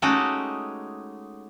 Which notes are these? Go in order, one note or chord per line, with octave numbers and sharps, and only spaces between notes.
G#3 A3 C#4 D#4 F#4 G4